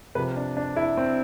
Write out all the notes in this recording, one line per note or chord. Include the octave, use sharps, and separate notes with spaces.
C3 F3 B4
D4
D4
E4
C4